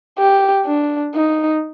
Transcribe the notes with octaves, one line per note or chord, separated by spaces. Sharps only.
G4
D4
D#4